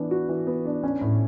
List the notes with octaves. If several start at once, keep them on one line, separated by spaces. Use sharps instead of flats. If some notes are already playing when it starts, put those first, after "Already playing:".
Already playing: E3 B3 D4
F#4
E3
B3
D4
C#4
A2